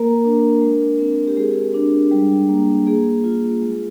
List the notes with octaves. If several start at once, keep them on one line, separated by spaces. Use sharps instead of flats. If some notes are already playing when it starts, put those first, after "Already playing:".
Already playing: A#3 A#4
D4
G#3
C4
G4
G#3 G#4
D4
G3
A#3
A#3 G#4
F4
G#3